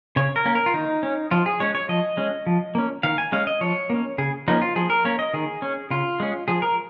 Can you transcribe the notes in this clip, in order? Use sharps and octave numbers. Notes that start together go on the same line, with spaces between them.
C#3 C#5
A#4
A#3 C#4
A#4
F4
D#3 D#4
C#4
F3 F4
G#4
G#3 C#4 C#5
C#5
F3 D#5
G#3 C#4
F3
A#3 C#4
D#3 F5
G#5
G#3 C#4 F5
D#5
F3 C#5
A#3 C#4
C#3 G#4
F3 A#3 C#4 D#4
F4
F3 G#4
A#4
A#3 C#4 C#5
D#5
D#3 G#4
C#4
C#3 F4
G#3 C#4
F3 G#4
A#4